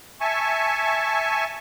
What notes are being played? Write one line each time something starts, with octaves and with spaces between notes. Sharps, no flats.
E5 G#5 A5 C#6